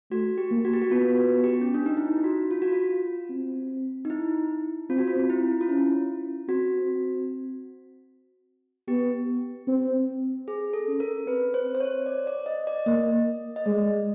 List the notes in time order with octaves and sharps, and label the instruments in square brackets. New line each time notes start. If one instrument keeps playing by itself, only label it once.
[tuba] A3 [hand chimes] F#4
[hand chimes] G4
[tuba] A#3
[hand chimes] F#4
G4
F#4
[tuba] B3 [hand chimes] F4
[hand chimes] F#4
G4
C#4
D4
D#4
E4
F#4
F4
F#4
F4
[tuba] C4
[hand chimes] D#4
E4
[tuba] C4 [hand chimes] F4
[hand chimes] F#4
F4
E4
F4
[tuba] C#4 [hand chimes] E4
[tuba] C4 [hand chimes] F#4
[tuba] B3 [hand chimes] G4
[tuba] C4
[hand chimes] G#4
A4
[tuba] C#4
[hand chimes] A#4
[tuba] C4 [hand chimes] B4
[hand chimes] C5
C5
C#5
D5
D5
D#5
D5
[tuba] A#3 [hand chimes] D#5
[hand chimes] D#5
[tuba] G#3 [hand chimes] D5